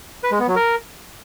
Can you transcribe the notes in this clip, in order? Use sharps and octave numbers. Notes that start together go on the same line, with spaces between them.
B4
G#3
B3
F#3
A#4